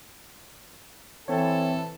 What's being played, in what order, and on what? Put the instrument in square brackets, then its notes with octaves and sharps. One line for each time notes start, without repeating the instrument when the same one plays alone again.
[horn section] E3 A4 [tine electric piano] C4 C#5